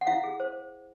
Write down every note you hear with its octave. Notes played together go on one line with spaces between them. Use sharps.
F#5
E4 F5
G#4
C5